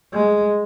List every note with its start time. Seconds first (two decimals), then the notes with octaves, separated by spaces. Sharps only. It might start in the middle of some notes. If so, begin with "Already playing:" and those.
0.13 G#3